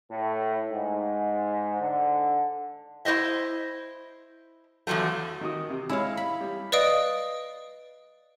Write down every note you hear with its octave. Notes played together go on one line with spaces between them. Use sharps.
A2
G#2
D3
E4 G4 C5 D#5 E5
E2 D3 F3 F#3 A3
D#3 F#4 D#6
C3
G#3 E4 C#5 F5
B5
G3
B4 D5 D#5 F5 D#6 D7